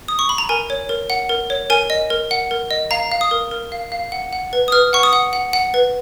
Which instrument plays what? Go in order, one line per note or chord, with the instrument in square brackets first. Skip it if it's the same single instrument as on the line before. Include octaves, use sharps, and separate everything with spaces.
[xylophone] D#6
C#6
B5
A#5
A#4 G#5
C#5
A#4
F#5
A#4
C#5
A#4 G#5
D#5
A#4
F#5
A#4
D#5
F5 A#5
F5
D#6
A#4
A#4
F5
F5
F#5
F#5
B4
D#6
B4 F6
F#5 C#6
D#6
F#5
F#5
F#5
B4